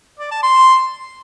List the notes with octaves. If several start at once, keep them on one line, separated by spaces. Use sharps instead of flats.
D5
A5
C6